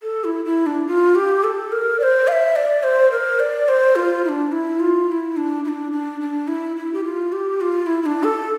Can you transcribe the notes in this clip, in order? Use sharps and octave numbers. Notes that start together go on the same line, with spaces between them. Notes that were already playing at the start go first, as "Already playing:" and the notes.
A4
E4
E4
D4
F4
G4
A4
A#4
D5
C5
F5
E5
D5
C5
A#4
D5
C5
F4
E4
D4
E4
F4
F4
E4
D4
E4
D4
D4
D4
E4
E4
G4
F4
G4
F4
F4
E4
E4
D4
A4